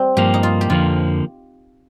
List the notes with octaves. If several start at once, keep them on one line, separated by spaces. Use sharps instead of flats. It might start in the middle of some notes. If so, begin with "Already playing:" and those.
Already playing: G3 C4
G2 F3 A#3 G4
D#4
F4
G4
F2 D3 F3 A#3 F4